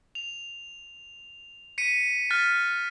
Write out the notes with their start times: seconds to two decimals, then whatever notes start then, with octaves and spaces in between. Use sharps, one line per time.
0.15 F7
1.78 B6 C#7 D#7
2.30 F6 F#6 A6 B6